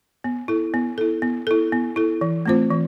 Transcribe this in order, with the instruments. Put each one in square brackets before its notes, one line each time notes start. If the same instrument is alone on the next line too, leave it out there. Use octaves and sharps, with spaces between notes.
[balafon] B3
E4 A4
B3
E4 A4
B3
E4 A4
B3
E4 A4
E3
A3 C4 F4 C5
E3